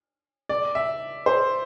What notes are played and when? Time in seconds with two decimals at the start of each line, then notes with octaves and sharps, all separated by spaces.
0.49 D5
0.75 E5
1.26 C5